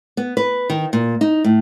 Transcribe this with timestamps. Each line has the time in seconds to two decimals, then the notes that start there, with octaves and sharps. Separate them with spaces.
0.17 B3
0.37 B4
0.70 D#3
0.93 A#2
1.21 D#4
1.44 A2